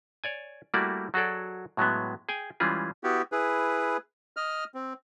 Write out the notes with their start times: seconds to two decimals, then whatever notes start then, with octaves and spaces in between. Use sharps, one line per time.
0.24 C#5 D5 G#5
0.74 G3 A3 A#3 E4 F#4 D5
1.14 F#3 F#4 G#4 A4 D5
1.77 A2 F#3 G#3 B3
2.29 G#4 G5 G#5
2.60 E3 G3 G#3 C#4 F4 G#4
3.04 B3 E4 F#4 G4
3.32 E4 G#4 B4
4.37 D#5 F6
4.74 C4